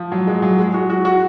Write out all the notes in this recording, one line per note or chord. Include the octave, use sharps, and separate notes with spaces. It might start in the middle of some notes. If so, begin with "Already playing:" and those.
Already playing: F3
F#3
G#3
F#3
G#3
F#4
F#4
F#4